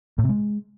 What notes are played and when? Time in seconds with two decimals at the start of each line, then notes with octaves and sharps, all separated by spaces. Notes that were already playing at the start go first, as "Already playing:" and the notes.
0.18 A2
0.24 C3
0.29 G#3